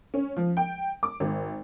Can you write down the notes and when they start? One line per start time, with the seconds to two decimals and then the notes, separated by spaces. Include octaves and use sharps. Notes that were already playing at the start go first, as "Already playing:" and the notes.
0.14 C#4
0.37 F3
0.57 G5
1.03 D6
1.20 G#1